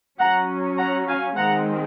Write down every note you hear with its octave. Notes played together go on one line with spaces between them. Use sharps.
F#3 C#4 F#5 A#5
F#5 A#5
F5 G#5
D#3 G#3 C4 F#5 A#5